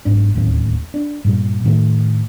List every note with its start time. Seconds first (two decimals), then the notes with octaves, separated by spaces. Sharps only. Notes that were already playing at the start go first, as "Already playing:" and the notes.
0.05 F#1 G#2 D4
0.35 D1 D#2 A2 C#4
0.94 D4
1.25 G2 A#2 G3
1.64 A2 D#3 A3